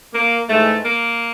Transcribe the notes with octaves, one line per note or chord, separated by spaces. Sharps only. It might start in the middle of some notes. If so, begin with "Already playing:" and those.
A#3
G#2 E3 G#3 A3
A#3